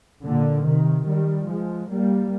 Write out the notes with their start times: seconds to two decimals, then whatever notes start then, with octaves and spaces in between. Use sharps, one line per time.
0.24 A#2 D3
0.66 C3 D#3
1.07 D#3 G3
1.49 F3 G#3
1.91 G3 A#3